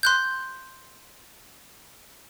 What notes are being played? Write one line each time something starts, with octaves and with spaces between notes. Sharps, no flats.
C6 F#6 G6